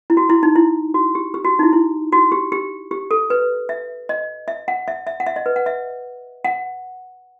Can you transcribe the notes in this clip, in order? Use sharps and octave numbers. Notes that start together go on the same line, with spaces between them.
E4
F#4
E4
D#4
E4
F#4
G4
G4
F#4
D#4
E4
E4
F#4
G4
G4
G4
A4
B4
E5
D#5
E5
F#5
E5
E5
F#5
E5
D#5
B4
F#5
E5
F#5